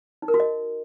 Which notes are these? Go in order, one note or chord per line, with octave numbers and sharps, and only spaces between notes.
D#4
A#4
F#4
D#5